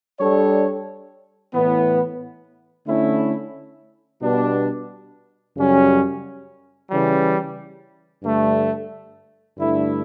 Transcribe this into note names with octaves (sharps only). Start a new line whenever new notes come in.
G3 D4 A4 C#5
A2 E3 B3
D3 A3 C#4 E4
B2 G3 B3 D4
F#2 C#3 G3 C#4
C#3 E3 G3
G2 D3 A3
G2 D3 A3 E4